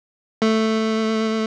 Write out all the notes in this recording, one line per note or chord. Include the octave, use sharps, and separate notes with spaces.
A3